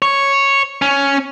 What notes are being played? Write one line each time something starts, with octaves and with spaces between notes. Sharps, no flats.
C#5
C#4